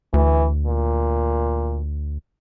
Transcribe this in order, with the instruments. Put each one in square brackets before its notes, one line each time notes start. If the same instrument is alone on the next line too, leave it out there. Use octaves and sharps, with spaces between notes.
[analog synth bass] D2 [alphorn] E3
[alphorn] A#2